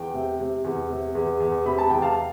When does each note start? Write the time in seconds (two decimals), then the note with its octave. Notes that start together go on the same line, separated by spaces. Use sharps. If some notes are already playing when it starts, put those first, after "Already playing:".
Already playing: E2 G5
0.14 C3
0.40 C3
0.64 E2
0.90 C3
1.15 E2
1.40 E2
1.66 C3 B5
1.78 A5
1.90 E2 G5
2.02 F5 A5